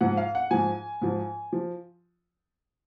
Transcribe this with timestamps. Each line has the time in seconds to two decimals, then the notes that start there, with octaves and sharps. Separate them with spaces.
0.01 G#2 F3 F#5
0.17 F5
0.35 F#5
0.51 G#2 F3 G#5
1.01 G#2 F3
1.53 F3